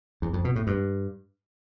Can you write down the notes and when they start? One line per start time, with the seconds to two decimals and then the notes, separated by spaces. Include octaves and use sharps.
0.22 E2
0.33 F2
0.44 B2
0.56 A2
0.67 G2